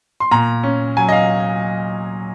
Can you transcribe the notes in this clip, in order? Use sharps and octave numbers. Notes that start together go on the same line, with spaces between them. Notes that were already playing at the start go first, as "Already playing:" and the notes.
C6
A#2 A#5
C#4
F#3 G#5
D#5
F5